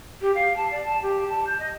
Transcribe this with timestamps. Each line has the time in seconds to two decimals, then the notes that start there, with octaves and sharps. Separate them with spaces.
0.21 G4
0.35 F5
0.56 A5
0.71 D5
0.85 A5
1.02 G4
1.29 A5
1.47 G6
1.59 D#5